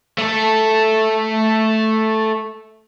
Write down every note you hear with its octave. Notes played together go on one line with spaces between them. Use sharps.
A3 A4